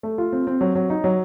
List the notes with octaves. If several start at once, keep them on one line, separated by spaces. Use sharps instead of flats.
A3
F4
C4
C4
F#3
F#3
D#4
F#3